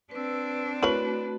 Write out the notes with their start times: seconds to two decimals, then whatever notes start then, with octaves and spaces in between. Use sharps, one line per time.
0.11 C4 D4 B4 E6
0.82 A3 E4 F#4 A#4 B4 C#5 F#7